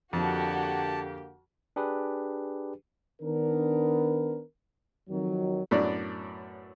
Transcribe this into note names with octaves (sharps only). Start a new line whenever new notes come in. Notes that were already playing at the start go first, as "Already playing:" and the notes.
F2 D3 A#3 F#4 G4 A5
D4 G4 G#4 B4
D#3 B3 D4 A#4
F2 D#3 F#3
F#2 A2 B3 D4 D5